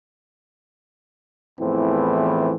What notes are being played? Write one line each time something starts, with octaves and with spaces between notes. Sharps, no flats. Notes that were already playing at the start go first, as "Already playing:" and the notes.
E2 A2 E3 F3 C4